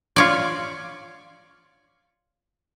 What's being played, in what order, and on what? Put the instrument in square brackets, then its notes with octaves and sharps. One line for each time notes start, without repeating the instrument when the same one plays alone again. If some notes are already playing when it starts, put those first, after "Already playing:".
[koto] F4 C#5 D5